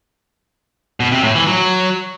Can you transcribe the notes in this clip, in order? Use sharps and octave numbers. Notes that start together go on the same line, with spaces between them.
B2
C3
A2
E3
F#3